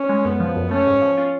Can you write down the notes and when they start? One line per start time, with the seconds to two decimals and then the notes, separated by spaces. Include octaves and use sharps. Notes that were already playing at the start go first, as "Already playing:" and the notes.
Already playing: C#4
0.09 G#3
0.24 F#2 B3
0.40 F3
0.56 F#2
0.71 A3 C#4
0.87 G#2
1.02 F3
1.18 F4